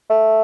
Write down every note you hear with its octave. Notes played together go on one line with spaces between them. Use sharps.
A3